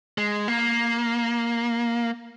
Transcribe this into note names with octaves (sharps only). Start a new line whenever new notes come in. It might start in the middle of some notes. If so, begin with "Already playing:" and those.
G#3
A#3